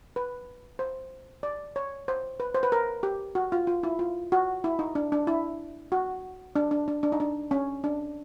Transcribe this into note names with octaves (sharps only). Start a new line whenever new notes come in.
B4
C5
D5
C#5
C5
B4
C5
B4
A#4
G4
F#4
F4
F4
E4
F4
F#4
E4
D#4
D4
D4
E4
F#4
D4
D4
D4
D4
D#4
D4
C#4
D4